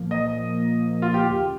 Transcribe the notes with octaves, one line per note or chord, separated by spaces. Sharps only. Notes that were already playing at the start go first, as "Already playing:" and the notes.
Already playing: A#2 F3 A#3
D#5
F4
G4
D#2 C#3 G#3